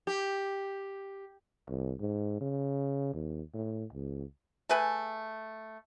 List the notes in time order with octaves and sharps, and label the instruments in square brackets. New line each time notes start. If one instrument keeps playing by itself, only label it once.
[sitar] G4
[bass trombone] C2
G#2
C#3
D#2
A2
C#2
[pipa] A3 G#4 B4 G#5